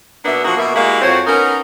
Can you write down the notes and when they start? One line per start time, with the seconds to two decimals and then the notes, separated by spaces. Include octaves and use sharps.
0.25 B2 A#3 B3 D4 E5
0.44 F3 A#3 D#4 F#4
0.58 B2 A#3 E5
0.75 G#3 A#3 E4 F#4 G4 F5
1.02 F2 C4 F#4 C5 C#5
1.27 B3 C#4 D#4 A#4